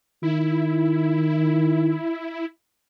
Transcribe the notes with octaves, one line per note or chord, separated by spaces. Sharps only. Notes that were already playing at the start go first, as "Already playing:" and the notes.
D#3 E4